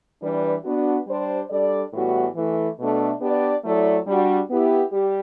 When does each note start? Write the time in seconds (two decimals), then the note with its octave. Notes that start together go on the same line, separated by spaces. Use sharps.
0.22 E3 G3 D4 G4 B4
0.64 B3 D4 F#4
1.07 G3 D4 G4 C5
1.49 G3 D4 A4 D5
1.93 A2 E3 G3 B3 F#4
2.35 E3 A3 E4
2.79 B2 A3 D4
3.21 B3 D4 G4 D5
3.64 F#3 A3 E4 A4 D5
4.06 G3 D4 F#4
4.49 B3 E4 G4
4.91 G3 G4